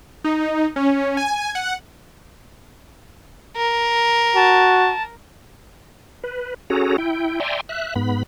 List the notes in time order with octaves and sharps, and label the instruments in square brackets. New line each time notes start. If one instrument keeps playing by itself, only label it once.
[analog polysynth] D#4
C#4
G#5
F#5
[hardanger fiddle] A#4
[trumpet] F#4 [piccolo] A5
[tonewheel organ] B4
C#4 F#4 G#4 A4 A#5
E4 G5
D5 E5 G5 G#5 A#5 C6
E5 F#6
G#2 B3 B5